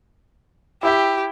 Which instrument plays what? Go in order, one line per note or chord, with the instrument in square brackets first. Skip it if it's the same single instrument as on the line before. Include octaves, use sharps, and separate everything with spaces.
[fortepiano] E4 E5 G5 [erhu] G4